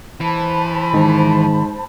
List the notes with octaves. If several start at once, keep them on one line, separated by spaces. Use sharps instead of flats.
E3 C5 A5 B5
G#2 D#3